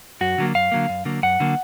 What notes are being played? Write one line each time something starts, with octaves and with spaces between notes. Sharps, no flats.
F#2 F#4
D3 F#3 A#3
F#2 F5
D3 F#3 A#3
F#2
D3 F#3 A#3
F#2 F#5
D3 F#3 A#3